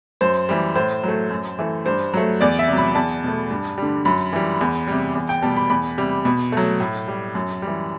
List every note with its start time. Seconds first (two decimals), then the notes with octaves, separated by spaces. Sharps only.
0.21 F#2 C5
0.49 E3 G3
0.75 A2 C5
1.03 F#3 A3
1.30 F#2
1.59 E3 A3
1.86 G2 C5
2.14 F#3 A3
2.41 E2 D5
2.59 E5
2.68 C3
2.73 F#3 B5
2.95 E2 A5
3.24 B2 A3
3.51 G2
3.78 D3 G3
4.05 F#2 B5
4.33 E3 G3
4.61 E2
4.87 C3 G3
5.15 E2
5.29 G5
5.42 B2 G3 A5
5.57 B5
5.70 E2 B5
5.97 C3 G3
6.25 B2
6.52 F#3 A3
6.80 A2
7.08 G3
7.35 F#2
7.62 E3 G3